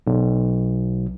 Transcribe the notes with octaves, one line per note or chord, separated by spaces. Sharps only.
B1